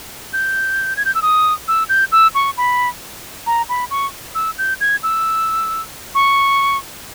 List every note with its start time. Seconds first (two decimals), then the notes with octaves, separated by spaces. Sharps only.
0.33 G6
0.97 G#6
1.05 G6
1.15 E6
1.22 D#6
1.68 E6
1.89 G6
2.12 E6
2.35 C#6
2.57 B5
3.46 A#5
3.69 B5
3.91 C#6
4.35 E6
4.58 G6
4.80 G#6
5.03 E6
6.15 C#6